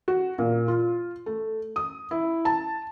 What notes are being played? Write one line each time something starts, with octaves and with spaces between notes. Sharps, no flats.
F#4
A#2
F4
A3
D#6
E4
A5